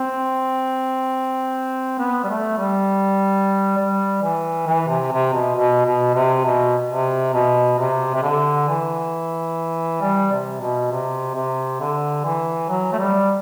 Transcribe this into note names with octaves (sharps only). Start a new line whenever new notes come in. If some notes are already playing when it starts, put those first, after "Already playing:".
Already playing: C4
B3
G3
A3
G3
G3
E3
E3
C3
C3
B2
B2
B2
C3
B2
C3
B2
C3
C3
D3
E3
G3
C3
B2
C3
C3
D3
E3
F#3
A3
G3